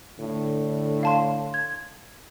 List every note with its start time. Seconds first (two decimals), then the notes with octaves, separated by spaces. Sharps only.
0.20 A2 D3
1.03 F5 A5 C6
1.54 G#6